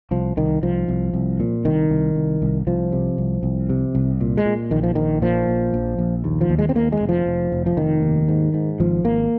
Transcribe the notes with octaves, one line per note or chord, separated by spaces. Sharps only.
C2 F3
C2 D#3
C2 F3
C2
C2
A#2
C2 D#3
C2
C2
C2
C2 F3
C3
C2
C2
C3
C2
A#2
G#3
A#2
A#1 D#3
F3
A#1 D#3
A#2 F3
A#1
A#1
A#1
D#2
F3
D#2
G#3
C4
D#2 A#3
G#3
F1
F3
F1
F1
F3
F1 D#3
D#2
G#2
G#2
G#1 F3
G#1 A#3